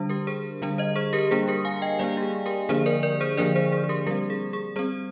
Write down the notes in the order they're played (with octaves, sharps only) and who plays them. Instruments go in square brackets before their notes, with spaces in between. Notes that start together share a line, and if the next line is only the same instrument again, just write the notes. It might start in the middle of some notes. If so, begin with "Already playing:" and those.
Already playing: [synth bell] D3 G3 D4
G4 A#4
G#4 C5
D3 G3 D4
C5 D#5
G#4 C5
G4 A#4
G3 A#3 D4 G#4
G4 A#4
F5 G#5
D#5 G5
G3 A#3 D4 D5 F5
G4
G#4
G4 A#4
D3 F3 A#3 D4 G#4 C5
A#4 D5
A#4 D5
G#4 C5
D3 F3 A#3 D4 A#4 D5
G#4 C5
G#4 C5
G#4
G4 A#4
G3 G4 A#4
C4
G#4
G#4
G3 G#4 C5
C4